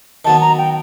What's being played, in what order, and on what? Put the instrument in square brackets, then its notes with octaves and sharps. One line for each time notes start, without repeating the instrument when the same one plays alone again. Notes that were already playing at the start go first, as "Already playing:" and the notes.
[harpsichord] D#3 F#3 B3 [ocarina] A5
[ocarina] A#5
G5